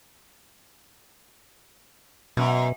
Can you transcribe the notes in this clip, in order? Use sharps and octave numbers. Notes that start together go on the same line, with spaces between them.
F#2 B2